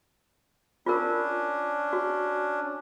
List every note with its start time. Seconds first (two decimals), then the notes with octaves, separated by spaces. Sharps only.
0.86 C#4 D4 F4 A#4
1.93 F#4